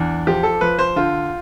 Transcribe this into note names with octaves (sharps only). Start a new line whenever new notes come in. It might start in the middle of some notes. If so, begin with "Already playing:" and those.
Already playing: E2 D4
F3 G4
A4
F3 B4
C5
D3 F4